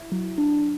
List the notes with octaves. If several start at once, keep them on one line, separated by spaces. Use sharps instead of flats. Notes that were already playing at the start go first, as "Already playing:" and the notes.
Already playing: E4
F#3
D4